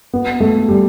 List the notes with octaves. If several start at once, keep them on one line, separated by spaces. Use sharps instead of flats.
B3
A3
G3